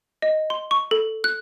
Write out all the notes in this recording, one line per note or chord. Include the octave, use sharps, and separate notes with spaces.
D#5
C6
C#6
A4
F#6